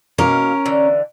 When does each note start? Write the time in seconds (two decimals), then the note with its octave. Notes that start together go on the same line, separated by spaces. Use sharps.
0.18 B2 A#3 C#4 A#4 F5
0.66 D3 E3